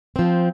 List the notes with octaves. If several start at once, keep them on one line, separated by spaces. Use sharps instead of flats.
F3 C4